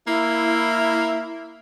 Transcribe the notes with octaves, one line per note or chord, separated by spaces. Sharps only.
A#3 E4